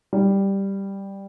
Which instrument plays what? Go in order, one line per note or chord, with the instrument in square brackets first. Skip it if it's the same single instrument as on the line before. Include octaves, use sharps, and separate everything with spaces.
[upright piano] G3